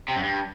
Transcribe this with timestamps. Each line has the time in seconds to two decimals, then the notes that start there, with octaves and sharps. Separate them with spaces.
0.08 C3
0.16 F#2
0.23 G2